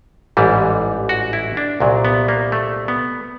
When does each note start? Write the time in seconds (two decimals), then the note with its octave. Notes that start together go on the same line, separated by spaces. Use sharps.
0.37 A1 G#2 E3 G3
1.09 F#4
1.33 E4
1.57 D4
1.80 C2 A#2 F#3
2.05 B3
2.29 A#3
2.52 A3
2.88 B3